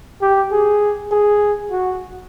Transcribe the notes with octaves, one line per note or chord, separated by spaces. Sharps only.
G4
G#4
G#4
F#4